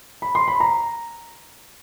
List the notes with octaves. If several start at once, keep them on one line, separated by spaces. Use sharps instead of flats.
B5
C6
B5
A#5